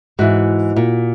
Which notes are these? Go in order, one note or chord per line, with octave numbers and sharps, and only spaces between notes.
G#2 E3 F#4
A#2